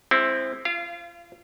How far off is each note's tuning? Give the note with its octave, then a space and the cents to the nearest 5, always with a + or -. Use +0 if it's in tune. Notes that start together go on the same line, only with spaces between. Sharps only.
G#3 -25 C4 +10 E4 +0
F4 -35 F5 -20